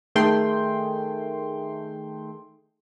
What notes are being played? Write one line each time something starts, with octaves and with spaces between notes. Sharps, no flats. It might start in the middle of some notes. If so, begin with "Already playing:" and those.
D#3 A3 G#4 G5 C6